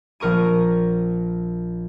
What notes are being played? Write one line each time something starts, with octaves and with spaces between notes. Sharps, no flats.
A#1 A#4 C#6 D#7